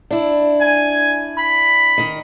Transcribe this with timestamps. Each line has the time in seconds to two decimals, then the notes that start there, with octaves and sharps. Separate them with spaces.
0.11 D4 E4
0.61 G#5
1.38 B5
1.98 D#3 D#4